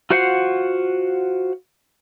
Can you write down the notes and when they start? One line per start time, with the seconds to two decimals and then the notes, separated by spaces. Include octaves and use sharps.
0.10 F4 F#4 C5 F5 F#5